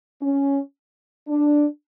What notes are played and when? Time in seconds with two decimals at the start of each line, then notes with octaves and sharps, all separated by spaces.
0.21 C#4
1.28 D4